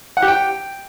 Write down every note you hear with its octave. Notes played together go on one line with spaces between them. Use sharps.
F#5
G4
G5